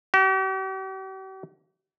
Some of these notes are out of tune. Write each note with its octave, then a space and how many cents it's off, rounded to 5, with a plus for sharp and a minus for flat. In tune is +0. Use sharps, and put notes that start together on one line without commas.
G4 -45